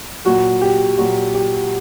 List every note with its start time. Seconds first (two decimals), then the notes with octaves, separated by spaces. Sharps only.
0.25 A#2 F#3 F#4
0.62 G4
0.98 A#2 F#3 F#4
1.35 G4